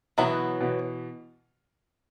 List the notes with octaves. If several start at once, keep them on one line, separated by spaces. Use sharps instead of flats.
B2 E3 F#3 B3 E4 B4
B2 E3